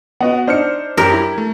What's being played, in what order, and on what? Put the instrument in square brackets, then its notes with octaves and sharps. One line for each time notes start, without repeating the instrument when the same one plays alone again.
[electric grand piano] B3 [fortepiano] F#4 D#5 F#5
[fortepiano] D4 D#4 [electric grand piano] C5 F6 C#7
[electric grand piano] F#2 [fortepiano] G4 [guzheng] A#4
[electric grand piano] E4
A3